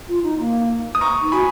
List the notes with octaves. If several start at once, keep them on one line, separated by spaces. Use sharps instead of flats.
F4
D#4
A#3
D#6
A#5 C#6
D#4
F#4 G#5 B5